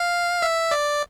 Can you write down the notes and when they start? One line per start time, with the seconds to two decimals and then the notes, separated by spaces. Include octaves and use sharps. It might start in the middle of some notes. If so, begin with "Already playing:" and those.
Already playing: F5
0.42 E5
0.71 D5